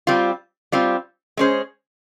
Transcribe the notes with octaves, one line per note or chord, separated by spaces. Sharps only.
G3 C4 F4
G3 C4 F4
G#3 C#4 G#4 C5